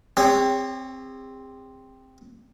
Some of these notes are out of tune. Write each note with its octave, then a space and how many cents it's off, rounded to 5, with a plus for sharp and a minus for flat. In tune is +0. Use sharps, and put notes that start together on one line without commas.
C4 +0 G#4 -45 C#5 +10